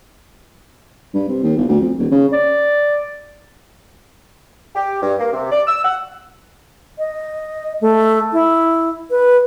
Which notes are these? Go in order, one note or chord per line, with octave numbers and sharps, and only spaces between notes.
G2
C3
D#2
G1
D2
F2
D#1
C#3
D5
G4
G2
A#3
C3
D5
E6
F#5
D#5
A3
E4
B4